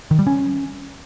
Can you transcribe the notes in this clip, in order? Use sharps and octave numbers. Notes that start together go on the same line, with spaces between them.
D#3
G3
C#4